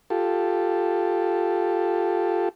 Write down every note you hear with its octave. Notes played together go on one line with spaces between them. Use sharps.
F4 G4 A4